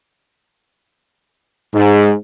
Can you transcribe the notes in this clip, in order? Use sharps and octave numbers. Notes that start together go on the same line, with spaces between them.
G#2